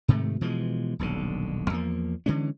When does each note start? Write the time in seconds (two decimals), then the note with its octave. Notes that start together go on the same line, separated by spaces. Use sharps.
0.08 G#2 C3 D#3 A3
0.41 B2 E3 F3 G#3
0.99 D#1 B1 D3
1.70 E2 F3 A#3
2.26 D3 E3 G#3 C#4